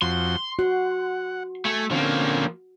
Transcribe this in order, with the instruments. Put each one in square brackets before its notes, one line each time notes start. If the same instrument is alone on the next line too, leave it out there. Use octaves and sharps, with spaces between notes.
[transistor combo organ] F2 F3 F#4 [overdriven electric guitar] C6
[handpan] F#4 [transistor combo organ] F#5
[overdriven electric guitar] A3 [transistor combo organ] G#5
[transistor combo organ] D3 C4 C#4 [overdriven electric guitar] F3 A#3